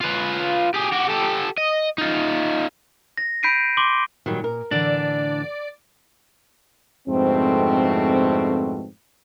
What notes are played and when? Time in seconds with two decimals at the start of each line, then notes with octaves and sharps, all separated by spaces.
0.01 F4 B4
0.74 G4 G#4
0.92 F#4 G4
1.09 G4 A4
1.58 D#5
1.98 D#4 F4
3.17 A#6
3.43 B5 G6 B6 C7 D7 D#7
3.77 C6 D6 F#7 G7
4.26 A#2 D#3 F#3 G3
4.44 A#4
4.71 A2 D3 E3 D4 D5
7.08 F2 G#2 B2 D3 A3 C4